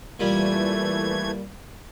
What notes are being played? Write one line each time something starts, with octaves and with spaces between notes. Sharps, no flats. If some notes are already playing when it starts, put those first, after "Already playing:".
A#2 E3 G3 A3 G#6